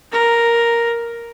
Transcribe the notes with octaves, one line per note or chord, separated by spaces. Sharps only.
A#4